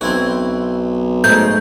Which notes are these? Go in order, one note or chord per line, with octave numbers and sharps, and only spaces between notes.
B1 C4 E4 F#4
G#2 A3 G6